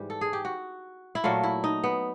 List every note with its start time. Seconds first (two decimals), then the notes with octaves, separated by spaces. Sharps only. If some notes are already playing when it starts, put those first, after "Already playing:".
Already playing: G#2 E3 G3 G4
0.10 A4
0.21 G#4
0.33 G4
0.45 F#4
1.15 E4
1.24 A#2 F#3 A3 F4
1.43 E4
1.64 D#4
1.84 B3